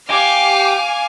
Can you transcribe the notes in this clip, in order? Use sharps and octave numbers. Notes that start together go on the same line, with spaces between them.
G4 F5 G#5 D6